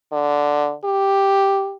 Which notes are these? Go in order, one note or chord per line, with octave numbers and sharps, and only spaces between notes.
D3
G4